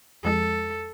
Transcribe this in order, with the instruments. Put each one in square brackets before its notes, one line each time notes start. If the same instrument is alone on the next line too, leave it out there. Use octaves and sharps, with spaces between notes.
[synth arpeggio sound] F2 G#3 [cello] A4